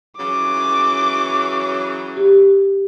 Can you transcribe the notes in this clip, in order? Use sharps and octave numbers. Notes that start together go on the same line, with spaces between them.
C#3 E3 F#3 D6
G4